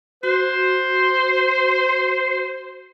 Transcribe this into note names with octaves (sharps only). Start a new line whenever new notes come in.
F#4 C5